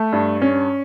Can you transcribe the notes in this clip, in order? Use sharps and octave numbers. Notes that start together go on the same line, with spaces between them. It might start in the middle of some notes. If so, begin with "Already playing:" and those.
Already playing: A3
G2
C#4